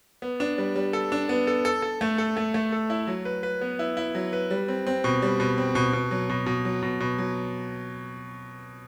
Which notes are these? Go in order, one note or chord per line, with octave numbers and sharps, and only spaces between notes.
B3
D4
G3
G3
A4
D4
B3
A4
A4
A4
A3
A4
A3
A3
A4
E4
F#3
B4
B4
B3
E4
E4
F#3
B4
G3
C4
C4
B2
G3
B2
C4
B2
B2
F#3
B2
B2
F#3
B2
B2
F#3